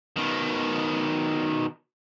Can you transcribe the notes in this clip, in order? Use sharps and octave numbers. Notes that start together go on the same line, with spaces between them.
B2 D#3